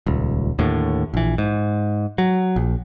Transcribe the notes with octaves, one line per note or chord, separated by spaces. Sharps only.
D#1 C#2
D#2 A2 D3
A#1 E3
G#2
F#3
A#1